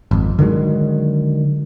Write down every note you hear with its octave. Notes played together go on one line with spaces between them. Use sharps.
G#1 F2
D3 D#3 F#3 G#3